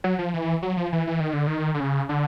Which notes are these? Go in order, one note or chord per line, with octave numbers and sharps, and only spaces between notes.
F#3
F3
E3
F#3
F3
E3
E3
D#3
D3
D#3
D3
C#3
D3